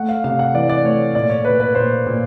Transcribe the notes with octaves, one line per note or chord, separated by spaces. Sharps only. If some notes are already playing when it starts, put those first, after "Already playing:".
Already playing: A3 F#5
F5
C3 F5
F#5
E3 D5
D5
A3 C#5
A#2 D5
C#5
A#2 B4
B4
A#2 C5
A#2